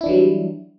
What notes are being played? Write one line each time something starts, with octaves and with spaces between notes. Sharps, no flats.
E3 F#3 G3 D4 E4